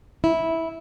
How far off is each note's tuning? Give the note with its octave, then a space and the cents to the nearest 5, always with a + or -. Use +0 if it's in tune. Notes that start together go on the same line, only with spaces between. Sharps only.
E4 -10